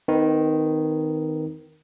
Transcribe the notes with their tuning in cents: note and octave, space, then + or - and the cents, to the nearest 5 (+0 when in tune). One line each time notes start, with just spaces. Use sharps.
D#3 +0 C4 -45 B4 +0